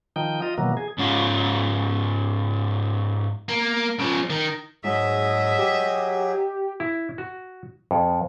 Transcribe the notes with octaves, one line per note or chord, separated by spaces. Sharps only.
D#3 F3 D#4 G5
F4 D#5
B2 D#3 E3 F#3 A#3
G#4
G#2 C#4 F4
A#3
C#3 F3
D#3
G#2 F#3 G#4 D#5 E5
G4
E4
F#4
F2